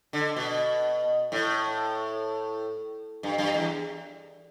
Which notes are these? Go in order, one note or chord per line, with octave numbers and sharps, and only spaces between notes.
D3
B2
A2
G2
G2
E2